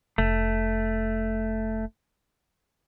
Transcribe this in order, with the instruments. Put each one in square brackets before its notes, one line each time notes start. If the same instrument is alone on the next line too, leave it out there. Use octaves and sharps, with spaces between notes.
[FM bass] F1 [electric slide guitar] A3